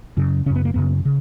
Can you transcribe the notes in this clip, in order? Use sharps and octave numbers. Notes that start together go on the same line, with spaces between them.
F#2 C#3
F#2 C#3 C#4
B3
A#3
F#2 C#3 B3
C#3